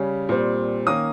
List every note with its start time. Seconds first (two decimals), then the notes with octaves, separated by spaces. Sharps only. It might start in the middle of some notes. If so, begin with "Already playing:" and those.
Already playing: C#3 G3 C#4
0.29 A#2 G3 C4
0.86 D#3 A#3 C#4 D#6